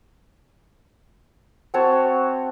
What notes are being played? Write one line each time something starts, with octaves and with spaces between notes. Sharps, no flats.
C4 F#4 C#5 A5